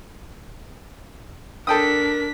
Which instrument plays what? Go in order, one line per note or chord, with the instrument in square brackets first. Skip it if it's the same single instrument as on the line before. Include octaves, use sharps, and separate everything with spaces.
[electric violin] D4 B6 [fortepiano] A4 G5 D#6 [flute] A#4